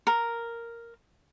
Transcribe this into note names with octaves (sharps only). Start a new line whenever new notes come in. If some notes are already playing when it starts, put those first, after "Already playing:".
A#4